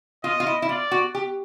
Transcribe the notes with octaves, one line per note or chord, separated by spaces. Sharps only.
F4 D#5
F4
E4
E4
F4 D5
F#4
G4